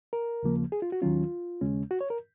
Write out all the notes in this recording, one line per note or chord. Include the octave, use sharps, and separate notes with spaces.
A#4
D#2 C#3 F3 A#3
G#4
F4
F#4
D#2 D#3 F#3 C#4 F4
D#2 C#3 G#3 C#4
F#4
C#5
A#4